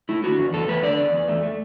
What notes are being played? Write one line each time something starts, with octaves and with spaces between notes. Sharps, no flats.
A3 E4
D3 F#4
E2
E2 A4
A3 B4
D3 D5
E2
E2
A3
A3